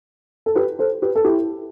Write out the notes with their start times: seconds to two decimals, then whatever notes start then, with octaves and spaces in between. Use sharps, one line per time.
0.46 A4
0.55 G4 B4
0.79 A4 C5
1.02 G4 B4
1.15 A4
1.24 E4 G4